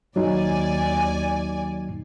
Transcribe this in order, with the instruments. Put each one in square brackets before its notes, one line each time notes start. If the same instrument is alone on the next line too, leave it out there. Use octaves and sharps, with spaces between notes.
[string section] D#2 D5 G#5 [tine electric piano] F#3 D#4